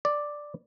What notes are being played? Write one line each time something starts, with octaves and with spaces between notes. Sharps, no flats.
D5